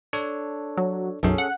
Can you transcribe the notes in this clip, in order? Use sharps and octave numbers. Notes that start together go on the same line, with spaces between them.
D4 A4 C#5
F#3
B1 F#2 C#4 G#4 A4
F#5